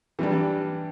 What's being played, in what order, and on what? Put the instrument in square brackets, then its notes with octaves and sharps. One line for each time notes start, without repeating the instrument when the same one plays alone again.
[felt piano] E3 G3 D4